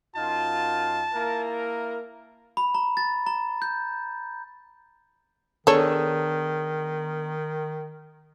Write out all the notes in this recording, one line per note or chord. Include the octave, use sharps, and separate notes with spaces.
F#2 D#4 F4 A5
A#3 E4 A#4
B5
A#5
A6
A#5
G6
D#3 B3 D4 G#4 A4 C#5